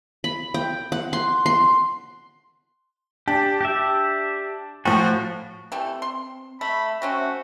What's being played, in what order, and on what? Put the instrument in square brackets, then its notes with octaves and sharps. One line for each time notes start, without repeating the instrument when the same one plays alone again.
[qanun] B5
G5
F#5
C6
C6
[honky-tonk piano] D4 [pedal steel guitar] G4
[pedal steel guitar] G4 E5
[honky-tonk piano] A2 F3 [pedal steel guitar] F#4
[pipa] E3 G3 A3 [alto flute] C4
[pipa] C6
[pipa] A3 [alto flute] E5 [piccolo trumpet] B5
[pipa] A3 C4 C#4 [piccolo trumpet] F#4